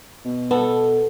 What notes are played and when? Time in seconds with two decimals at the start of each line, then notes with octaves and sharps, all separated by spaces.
0.25 B2
0.51 B3 A4